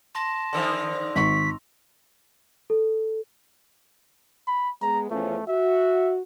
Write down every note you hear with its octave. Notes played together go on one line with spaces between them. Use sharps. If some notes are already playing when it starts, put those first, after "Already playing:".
A5 C6 A#6
D3 D#3 F3 C6 E6 F7
G#1 C#6 B6
A4
B5
G#3 B3 A#5
E2 F3 A3 C#4
F#4 E5